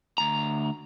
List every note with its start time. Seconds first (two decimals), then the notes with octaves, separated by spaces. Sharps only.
0.18 D2 A#5